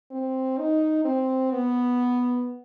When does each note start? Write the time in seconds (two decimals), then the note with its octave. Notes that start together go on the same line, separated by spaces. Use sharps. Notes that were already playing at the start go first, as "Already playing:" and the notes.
0.11 C4
0.58 D#4
1.04 C4
1.52 B3